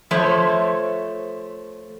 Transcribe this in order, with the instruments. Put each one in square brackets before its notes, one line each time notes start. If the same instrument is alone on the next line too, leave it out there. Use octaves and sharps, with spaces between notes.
[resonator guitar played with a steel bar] F3 A3 C5 C#5